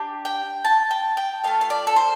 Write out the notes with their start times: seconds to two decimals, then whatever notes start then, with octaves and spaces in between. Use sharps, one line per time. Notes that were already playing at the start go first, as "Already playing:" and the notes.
Already playing: D4 G4
0.25 G5
0.65 A5
0.91 G5
1.17 G5
1.43 A3 F4 A4 F5
1.61 F5
1.70 D5
1.87 A4
1.96 C5